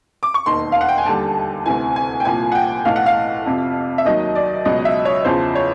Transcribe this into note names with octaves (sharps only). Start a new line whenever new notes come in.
D6
C#6
E1 D#2 D#3 C6
F5
F#5
G5
G#5
D#2 D3 G3 A5
D2 C3 E3 G#5
G#5
G5
C2 A#2 F3 G#5
F#5
G5
B1 A2 E3 F5
F#5
F5
F2 C3 F3
E5
D#2 D#3 F#3 D#5
D5
C#2 B2 F#3 D#5
E5
C#5
E2 C#3 F3 C5
C#5